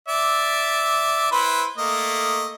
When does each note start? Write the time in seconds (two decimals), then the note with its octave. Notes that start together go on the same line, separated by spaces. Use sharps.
0.08 D5 E5
1.32 E4 B4 C5
1.78 A3 A#3 D#5